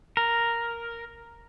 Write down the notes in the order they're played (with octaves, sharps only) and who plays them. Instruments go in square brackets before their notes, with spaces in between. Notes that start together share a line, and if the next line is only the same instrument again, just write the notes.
[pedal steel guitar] A#4